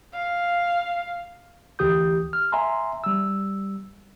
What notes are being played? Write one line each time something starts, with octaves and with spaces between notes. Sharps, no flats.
F5
D2 E3 G4 D#6 G6
F6
E5 G#5 A#5 C6
G3 E6